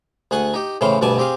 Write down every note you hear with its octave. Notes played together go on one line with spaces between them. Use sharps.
D2 G#4 F#5 G#5 C#6
D#4 G4
A2 C#3 E3 C5 F5 G5
D2 G2 B2 D5 G#5 A5
C4 G4 G#4 F5